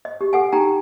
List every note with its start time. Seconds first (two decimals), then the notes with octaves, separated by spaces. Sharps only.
0.05 D#5
0.21 G4
0.33 A4 F#5 G#5
0.52 D#4 G4 G5 G#5 A#5